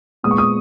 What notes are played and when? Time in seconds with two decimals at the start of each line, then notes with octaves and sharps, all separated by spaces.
0.23 A#2 G#3 B3 D#6
0.31 C#6
0.38 D#6